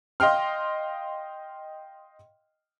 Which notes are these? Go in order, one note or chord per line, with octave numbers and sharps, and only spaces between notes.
D#5 F5 G5 C6 F6